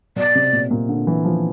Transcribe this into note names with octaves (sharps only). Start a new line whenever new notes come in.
B2 D5
C3
A#2
A#2
D3
E3
F3